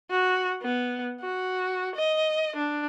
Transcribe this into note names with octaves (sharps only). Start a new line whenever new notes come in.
F#4
B3
F#4
D#5
D4